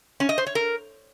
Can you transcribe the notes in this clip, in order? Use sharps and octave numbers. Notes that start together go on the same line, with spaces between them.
C#4
D#5
C5
C#5
A#4